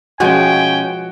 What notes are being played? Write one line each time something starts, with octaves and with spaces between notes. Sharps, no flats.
B2 F3 G#3 C#4 F#4 G5 G#5